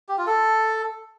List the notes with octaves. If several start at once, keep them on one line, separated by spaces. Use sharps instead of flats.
G4
F4
A4